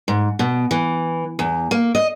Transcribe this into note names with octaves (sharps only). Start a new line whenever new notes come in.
G#2
B2
E3
E2
A#3
D#5